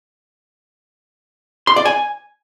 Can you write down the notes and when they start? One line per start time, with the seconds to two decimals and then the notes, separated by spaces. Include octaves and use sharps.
1.67 C6
1.76 D5
1.85 G#5